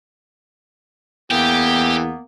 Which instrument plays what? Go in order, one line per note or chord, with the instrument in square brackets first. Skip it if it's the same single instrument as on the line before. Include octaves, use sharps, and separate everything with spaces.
[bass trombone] E2 [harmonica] E3 G5 [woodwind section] A#3 B3 [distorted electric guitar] G4